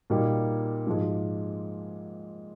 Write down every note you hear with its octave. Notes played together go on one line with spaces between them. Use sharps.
A#2 G3 A#3 D#4
G#2 F3 G#3